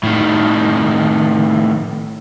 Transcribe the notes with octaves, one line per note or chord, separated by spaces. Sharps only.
A2 D#3